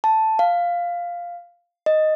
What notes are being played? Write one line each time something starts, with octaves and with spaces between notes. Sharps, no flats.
A5
F5
D#5